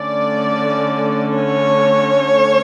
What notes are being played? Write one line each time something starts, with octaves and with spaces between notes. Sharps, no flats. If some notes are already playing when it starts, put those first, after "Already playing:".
Already playing: D3 A3 C#4 D5
C#5